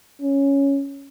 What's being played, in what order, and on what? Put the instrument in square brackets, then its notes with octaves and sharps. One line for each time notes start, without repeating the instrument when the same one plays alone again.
[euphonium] C#4